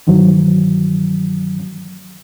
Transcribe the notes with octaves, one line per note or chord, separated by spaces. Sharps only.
G2 D#3 E3 F#3